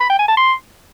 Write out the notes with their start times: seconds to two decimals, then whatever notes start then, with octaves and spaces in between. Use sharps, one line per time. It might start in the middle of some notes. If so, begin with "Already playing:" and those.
0.01 B5
0.10 G5
0.19 G#5
0.28 A5
0.37 C6